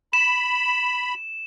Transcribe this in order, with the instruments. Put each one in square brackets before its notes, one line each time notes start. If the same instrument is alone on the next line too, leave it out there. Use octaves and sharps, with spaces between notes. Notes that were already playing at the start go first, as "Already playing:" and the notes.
[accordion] B5 [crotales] E7